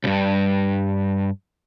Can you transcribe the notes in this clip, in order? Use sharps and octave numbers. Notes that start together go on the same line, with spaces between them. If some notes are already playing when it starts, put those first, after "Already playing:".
C2 G2